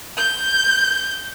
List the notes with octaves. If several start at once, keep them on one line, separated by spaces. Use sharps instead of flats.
G6